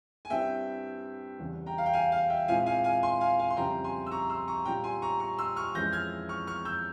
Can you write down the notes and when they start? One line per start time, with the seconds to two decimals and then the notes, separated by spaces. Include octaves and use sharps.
0.25 G#5
0.30 G2 G3 C4 E4 E5 G5
1.39 E2 C#3 G3
1.66 G5 A#5
1.78 F5
1.86 G5
1.93 F5 G#5
2.12 F5
2.30 E5 G5
2.48 A#2 G#3 C4 E4 F5 G#5
2.66 F5 G#5
2.84 F5 G#5
3.03 G#5 C6
3.21 F5 G#5
3.39 F5 G#5
3.50 C6
3.57 F2 C#3 G3 C4 E4 G5 A#5
3.84 G#5 C6
4.06 E6
4.12 A#5 C#6
4.30 C6 E6
4.48 A#5 C#6
4.65 A#2 G3 C#4 G5 A#5
4.84 G#5 C6
5.02 A#5 C#6
5.20 A#5 C#6
5.38 C6 E6
5.56 C#6 F6
5.75 F2 E3 G#3 C#4 G6 A#6
5.93 F6 G#6
6.29 C#6 F6
6.47 C#6 F6
6.65 E6 G6